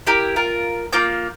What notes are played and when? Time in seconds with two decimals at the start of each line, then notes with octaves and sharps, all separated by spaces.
0.06 E4 G4 A#4
0.36 F4 A#4
0.93 A#3 F4 D6 G6